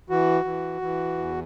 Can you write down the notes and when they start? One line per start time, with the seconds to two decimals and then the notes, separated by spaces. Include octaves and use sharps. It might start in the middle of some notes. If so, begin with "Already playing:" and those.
0.10 E3 F#4
0.45 E3
0.82 E3
1.18 E2